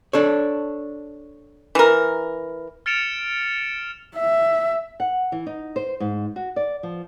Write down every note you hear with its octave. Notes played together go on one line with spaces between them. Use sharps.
D4 A4 C#5
E3 A#4
F6 A6 C#7 D7 E7 F7
E5
F#5
E3
D#4
C5
G#2
F#4
D5
F3